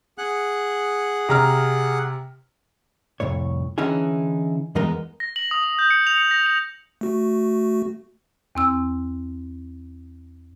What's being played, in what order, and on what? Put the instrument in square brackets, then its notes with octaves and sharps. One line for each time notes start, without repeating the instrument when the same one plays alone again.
[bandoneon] G#4 F#5 F#6
[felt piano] C3 A#5 F6
[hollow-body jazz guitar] C2 F2 A2 C#5
D3 E3 C#4 D#4 E4 G#4
E2 E3 G#3 B3 A#4 D#5
[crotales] A#6
F#7
D#6
F#7
G6
C#7
F7
C#7
A#6
F7
[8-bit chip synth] A3 F#4
[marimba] E2 C4 E6